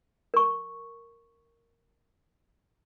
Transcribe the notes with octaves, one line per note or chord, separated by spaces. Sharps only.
A#4 C#6